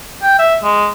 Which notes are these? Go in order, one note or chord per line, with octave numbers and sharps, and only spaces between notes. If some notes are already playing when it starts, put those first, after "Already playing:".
G5
E5
G#3